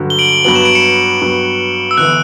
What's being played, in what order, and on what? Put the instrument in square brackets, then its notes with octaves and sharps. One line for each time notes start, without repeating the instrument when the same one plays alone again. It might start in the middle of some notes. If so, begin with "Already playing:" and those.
Already playing: [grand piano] G2 D3 F#3
[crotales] G7
D7 F#7
[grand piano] G2 F#3 B3 [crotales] F#7
[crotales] E7
D7
C#7 E7
[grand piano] G2 F#3 B3
[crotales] E6
[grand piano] G1 E3 B3 [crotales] F#6